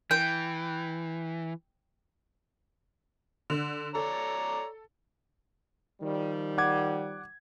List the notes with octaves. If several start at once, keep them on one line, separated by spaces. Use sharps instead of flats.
E3 G5
D3
A4 C#5 D5 A#5
D#3 F3 G3
F#5 D6 G#6